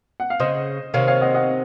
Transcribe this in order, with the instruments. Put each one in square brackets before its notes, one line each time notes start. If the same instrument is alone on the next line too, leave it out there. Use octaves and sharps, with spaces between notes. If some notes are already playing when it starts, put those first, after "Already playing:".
[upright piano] F#5
F5
[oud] C#3 [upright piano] C5 D#5
[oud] C3 D#3 [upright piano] C#5 F5
[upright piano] C#5 F5
D#5 F#5
D#5 F#5